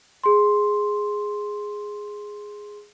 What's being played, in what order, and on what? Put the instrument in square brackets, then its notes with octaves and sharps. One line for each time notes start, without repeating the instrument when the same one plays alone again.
[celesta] G#4 C6